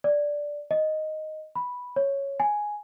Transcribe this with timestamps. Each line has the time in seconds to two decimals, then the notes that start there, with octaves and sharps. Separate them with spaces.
0.04 D5
0.71 D#5
1.56 B5
1.96 C#5
2.40 G#5